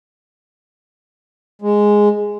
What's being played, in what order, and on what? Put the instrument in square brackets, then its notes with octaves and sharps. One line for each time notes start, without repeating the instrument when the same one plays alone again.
[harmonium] G#3